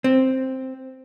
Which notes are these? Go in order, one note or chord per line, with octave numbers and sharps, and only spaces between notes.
C4